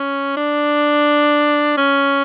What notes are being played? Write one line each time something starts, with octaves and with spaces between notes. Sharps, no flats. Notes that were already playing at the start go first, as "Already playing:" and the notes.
Already playing: C#4
D4
C#4